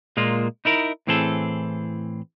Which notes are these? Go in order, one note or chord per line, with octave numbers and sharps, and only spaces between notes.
A#2 G#3 A#3 F4
D#4 E4 A#4
A2 E3 C4 G#4 A4